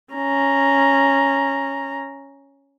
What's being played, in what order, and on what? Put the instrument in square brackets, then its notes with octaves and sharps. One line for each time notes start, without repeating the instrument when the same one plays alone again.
[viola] C#4 A#5